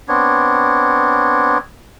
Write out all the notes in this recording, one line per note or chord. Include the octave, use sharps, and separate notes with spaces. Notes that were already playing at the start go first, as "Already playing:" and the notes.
B3 C4 D4 C#5